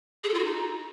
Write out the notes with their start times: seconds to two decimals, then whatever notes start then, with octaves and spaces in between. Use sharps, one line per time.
0.23 G#4
0.28 A4
0.33 F4
0.39 F#4
0.44 D#4